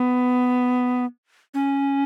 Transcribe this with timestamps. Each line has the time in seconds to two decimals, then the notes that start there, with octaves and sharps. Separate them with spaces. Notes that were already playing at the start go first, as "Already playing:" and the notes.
Already playing: B3
1.54 C#4